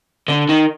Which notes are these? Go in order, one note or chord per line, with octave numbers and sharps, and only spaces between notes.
D3
D#3